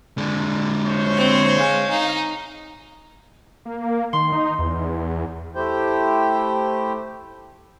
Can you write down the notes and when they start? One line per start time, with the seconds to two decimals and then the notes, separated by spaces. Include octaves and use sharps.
0.18 D3 G#3
0.85 C5 C#5
1.17 C4
1.58 G#3 F5
1.90 D#4
3.65 A#3
4.13 D#3 C6
4.32 D#4
4.59 E2
5.55 A3 E4 G4 C5 G5